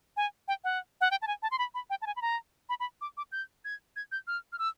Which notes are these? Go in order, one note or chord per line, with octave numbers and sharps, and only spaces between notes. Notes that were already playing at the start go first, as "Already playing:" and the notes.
G#5
G5
F#5
F#5
G5
A5
G#5
A5
C6
B5
B5
G5
A5
G#5
B5
A#5
B5
B5
D6
D6
G6
G#6
G#6
G6
F6
F6
E6